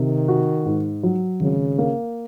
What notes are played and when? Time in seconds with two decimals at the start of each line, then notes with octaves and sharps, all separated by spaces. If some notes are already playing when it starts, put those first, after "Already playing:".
Already playing: C3 D#3
0.28 F#4
0.66 G#2
1.03 F#3
1.40 G#1 C#3
1.79 A#3